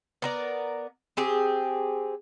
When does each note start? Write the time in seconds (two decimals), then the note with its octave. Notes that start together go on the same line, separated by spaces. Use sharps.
0.22 B3 A#4 D5
1.17 C4 G4 G#4